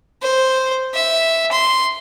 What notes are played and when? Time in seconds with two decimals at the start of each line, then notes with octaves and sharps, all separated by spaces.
0.22 C5
0.95 E5
1.52 C6